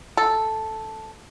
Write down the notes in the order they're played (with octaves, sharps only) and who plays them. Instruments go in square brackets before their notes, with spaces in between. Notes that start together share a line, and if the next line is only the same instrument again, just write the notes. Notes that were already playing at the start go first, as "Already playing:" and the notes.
[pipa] A4